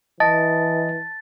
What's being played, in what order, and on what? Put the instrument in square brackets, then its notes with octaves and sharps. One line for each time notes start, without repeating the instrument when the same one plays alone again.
[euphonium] E3 [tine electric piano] D#5 [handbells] A5 [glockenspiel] A6